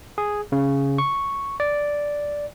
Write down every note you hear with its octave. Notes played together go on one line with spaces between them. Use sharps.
G#4
C#3
C#6
D5